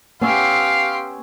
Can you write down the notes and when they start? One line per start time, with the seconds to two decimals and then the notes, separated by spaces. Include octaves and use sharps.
0.21 B3 C#4 G4 F5 C6 E6